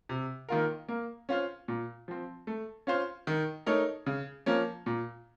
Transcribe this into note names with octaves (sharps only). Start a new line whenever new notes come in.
C3
D#3 A#3 F4 A#4
A#3
C#4 F4 C5
A#2
F3 C4
A3
C#4 F4 C5
D#3
A3 D#4 A#4 C#5
C#3
F3 A#3 C#4
A#2